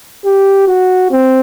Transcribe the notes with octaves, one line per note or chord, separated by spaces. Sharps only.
G4
F#4
C4